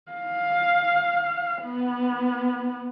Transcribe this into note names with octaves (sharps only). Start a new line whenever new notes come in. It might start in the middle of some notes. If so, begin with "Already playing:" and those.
F5
B3